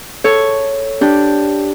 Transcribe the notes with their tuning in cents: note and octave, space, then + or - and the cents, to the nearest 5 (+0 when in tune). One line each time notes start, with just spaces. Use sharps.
A4 +0 C#5 +0
D4 +0 G4 +0